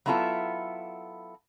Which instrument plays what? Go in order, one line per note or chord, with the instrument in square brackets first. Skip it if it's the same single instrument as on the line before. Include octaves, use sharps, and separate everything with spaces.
[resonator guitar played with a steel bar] F#3 B3 E4 F4 A4 E5